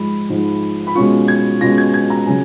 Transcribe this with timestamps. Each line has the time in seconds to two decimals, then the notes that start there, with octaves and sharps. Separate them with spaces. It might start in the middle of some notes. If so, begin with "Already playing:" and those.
Already playing: G#2 F3 G#3 B5
0.29 G#2 F3 G#3
0.87 B5
0.95 B2 G#3 C#4 F4 C#6
1.28 G#6
1.61 B2 G#3 C#4 F4 A#6
1.78 G#6
1.94 G#6
2.10 A#5
2.26 C#3 F#3 G#5